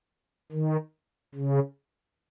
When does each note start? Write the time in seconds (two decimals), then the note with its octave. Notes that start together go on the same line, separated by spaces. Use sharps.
0.52 D#3
1.35 C#3